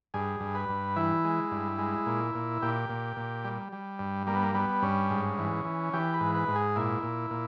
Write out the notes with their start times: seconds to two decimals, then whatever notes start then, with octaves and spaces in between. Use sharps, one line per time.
0.14 G2 G#4
0.40 G2
0.55 B4
0.69 G2
0.96 E3 E4
1.24 G#3
1.51 G2
1.78 G#3
2.06 A#2
2.35 A#2
2.62 A#2 G4
2.89 A#2
3.17 A#2
3.45 G3
3.73 G3
3.99 G2
4.27 G3 A#3
4.36 B3
4.43 A#3
4.55 G3 B3
4.82 G2 C#4
5.10 G#2
5.38 E3
5.65 E3
5.93 E3 G4
6.14 B4
6.20 G#2
6.35 B4
6.48 G#2
6.56 G#4
6.76 A#2 E4
7.03 A#2
7.30 A#2